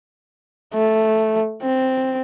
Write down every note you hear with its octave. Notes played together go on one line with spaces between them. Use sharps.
A3
C4